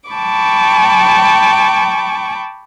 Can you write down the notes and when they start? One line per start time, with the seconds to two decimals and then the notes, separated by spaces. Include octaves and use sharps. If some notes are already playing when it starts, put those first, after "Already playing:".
0.11 G5 A5 B5 C#6 D6